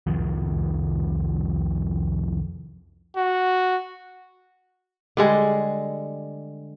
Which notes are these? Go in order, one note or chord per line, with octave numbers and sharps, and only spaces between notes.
C2 F2 D#3 F3
F#4
D3 G3 G#3